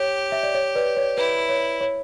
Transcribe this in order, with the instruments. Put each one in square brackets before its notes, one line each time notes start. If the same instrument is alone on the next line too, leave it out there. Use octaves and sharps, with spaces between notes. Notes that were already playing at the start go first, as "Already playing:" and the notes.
Already playing: [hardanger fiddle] G4 [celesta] C#5
[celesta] E5
D5
C#5
B4 D5
C#5
[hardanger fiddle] E4 [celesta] B4
[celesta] C#5
C#5